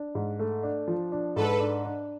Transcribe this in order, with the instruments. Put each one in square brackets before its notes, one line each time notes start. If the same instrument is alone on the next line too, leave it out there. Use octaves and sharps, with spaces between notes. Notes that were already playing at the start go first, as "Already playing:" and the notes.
Already playing: [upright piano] D4
G#2
A3
D4
F3
D4
[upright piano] G#2 [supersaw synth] A4 B4
[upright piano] D4
D4